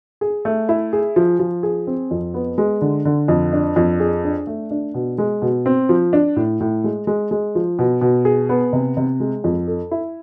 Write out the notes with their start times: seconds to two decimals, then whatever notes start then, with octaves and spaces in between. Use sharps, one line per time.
0.21 G#4
0.45 A3
0.69 E4
0.93 G#4
1.16 F3
1.39 F3
1.63 G#4
1.87 C4
2.11 F2
2.34 B3
2.58 G#3
2.81 D3
3.05 D3
3.28 F2
3.53 D4
3.76 F2
4.00 G#4
4.24 D4
4.47 A3
4.71 D4
4.94 B2
5.18 G#3
5.42 B2
5.66 C4
5.89 F3
6.13 D4
6.36 A2
6.60 A2
6.84 G#3
7.07 G#3
7.31 G#3
7.55 F3
7.79 B2
8.01 B2
8.25 G#4
8.49 B3
8.73 C3
8.97 C3
9.20 G#3
9.44 F2
9.67 A4
9.91 E4